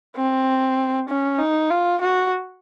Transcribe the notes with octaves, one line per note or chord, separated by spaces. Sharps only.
C4
C#4
D#4
F4
F#4